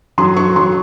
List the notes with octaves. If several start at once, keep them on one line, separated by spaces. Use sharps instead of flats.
F#3 C6
F#3 C#6
F#3 C6